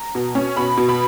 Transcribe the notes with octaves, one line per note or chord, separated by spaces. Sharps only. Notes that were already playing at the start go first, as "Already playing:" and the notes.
Already playing: A#5
B2
C#4
B2 B5
B2
B5